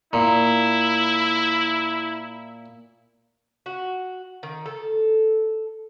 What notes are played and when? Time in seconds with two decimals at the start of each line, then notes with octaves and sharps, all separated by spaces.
0.13 A#2 E4
3.66 F#4
4.43 D#3
4.66 A4